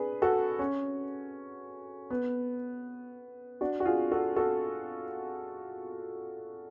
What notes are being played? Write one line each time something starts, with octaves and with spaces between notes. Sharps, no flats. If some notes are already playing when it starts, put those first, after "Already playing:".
Already playing: D4 G#4 B4
F#4 A4
C#4
B3
D4 F#4
F#4
F4 G#4
F#4 A4
F#4 A4